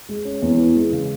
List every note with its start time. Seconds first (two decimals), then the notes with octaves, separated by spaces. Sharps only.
0.09 G#3
0.25 C#4
0.42 E2
0.58 E3
0.75 G#3
0.92 C#3